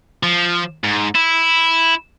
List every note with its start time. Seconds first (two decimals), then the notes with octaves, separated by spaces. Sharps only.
0.23 F3
0.84 G#2
1.15 E4